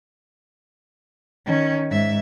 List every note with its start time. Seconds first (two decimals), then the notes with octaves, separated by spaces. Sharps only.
1.46 D#3 C#4
1.91 G#2 E5